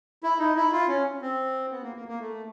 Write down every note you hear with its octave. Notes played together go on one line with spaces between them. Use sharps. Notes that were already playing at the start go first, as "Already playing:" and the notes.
E4
D#4
E4
F4
C#4
C4
B3
A#3
A#3
A#3
A3